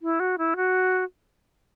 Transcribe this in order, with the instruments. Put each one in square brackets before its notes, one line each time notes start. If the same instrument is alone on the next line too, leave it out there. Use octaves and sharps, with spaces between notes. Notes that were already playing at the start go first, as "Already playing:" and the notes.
[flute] E4
F#4
E4
F#4